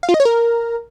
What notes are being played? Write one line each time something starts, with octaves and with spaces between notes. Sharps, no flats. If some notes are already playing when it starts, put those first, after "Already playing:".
F5
F4
D#5
C#5
A#4